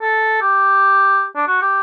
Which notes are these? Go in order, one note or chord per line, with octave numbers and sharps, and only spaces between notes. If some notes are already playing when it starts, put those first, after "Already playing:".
A4
G4
D4
F#4
G4